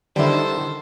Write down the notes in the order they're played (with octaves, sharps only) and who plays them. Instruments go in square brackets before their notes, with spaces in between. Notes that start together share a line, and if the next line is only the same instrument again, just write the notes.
[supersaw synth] D3 D#3 [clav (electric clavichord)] G3 E4 [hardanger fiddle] A4 C5